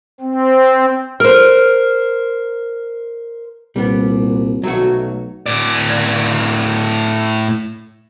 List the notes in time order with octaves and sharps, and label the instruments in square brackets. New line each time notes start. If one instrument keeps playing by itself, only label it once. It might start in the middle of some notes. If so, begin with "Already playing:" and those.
[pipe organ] C4
[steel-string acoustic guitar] A#4 C5 [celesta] F6
[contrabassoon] C2 [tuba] A#2 [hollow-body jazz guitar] G3 B3
[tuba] B1 [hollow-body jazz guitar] F#3 A3 F#4
[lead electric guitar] A2 D5